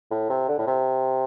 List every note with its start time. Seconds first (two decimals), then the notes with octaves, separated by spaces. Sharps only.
0.11 A2
0.30 C3
0.49 D3
0.59 A2
0.67 C3